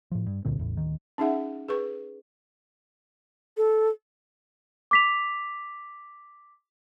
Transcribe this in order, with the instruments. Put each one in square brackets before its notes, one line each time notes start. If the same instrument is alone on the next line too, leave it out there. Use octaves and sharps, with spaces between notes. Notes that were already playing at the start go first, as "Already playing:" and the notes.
[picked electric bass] A2 F3
G2
C#2 A#2 D3 C4
A1 E2 A2
D1 D#3
[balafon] C#4 D#4 G#4 E5 F#5
G#4 B4 C#6
[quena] A4
[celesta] D6 B6 F7